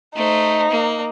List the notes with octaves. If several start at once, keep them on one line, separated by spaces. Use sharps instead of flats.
A3 D#4 C5
A#3